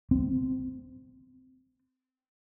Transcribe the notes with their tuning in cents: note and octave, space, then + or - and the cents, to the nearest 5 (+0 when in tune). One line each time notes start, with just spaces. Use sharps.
C4 -20